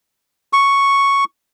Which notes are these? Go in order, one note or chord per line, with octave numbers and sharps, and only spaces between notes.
C#6